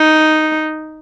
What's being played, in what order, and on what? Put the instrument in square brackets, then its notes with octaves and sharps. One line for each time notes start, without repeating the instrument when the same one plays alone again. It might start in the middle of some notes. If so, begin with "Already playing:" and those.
Already playing: [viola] D#4